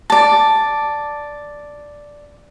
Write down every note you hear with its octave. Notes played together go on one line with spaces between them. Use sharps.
D5 A5